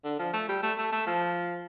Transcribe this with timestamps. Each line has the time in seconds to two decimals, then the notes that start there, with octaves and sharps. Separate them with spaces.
0.05 D3
0.19 F3
0.34 A3
0.48 G3
0.63 A3
0.78 A3
0.93 A3
1.07 F3